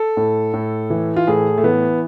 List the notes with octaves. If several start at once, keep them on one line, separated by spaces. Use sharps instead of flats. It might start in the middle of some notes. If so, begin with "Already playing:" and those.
Already playing: A4
A2
A2
E3
F4
A2 G#4
A3
E3 B3